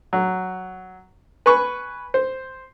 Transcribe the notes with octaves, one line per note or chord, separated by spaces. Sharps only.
F#3
B4 G#5 B5 C#6
C5